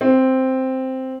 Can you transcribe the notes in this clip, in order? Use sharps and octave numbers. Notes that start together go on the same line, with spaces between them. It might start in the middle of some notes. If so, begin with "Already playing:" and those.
C4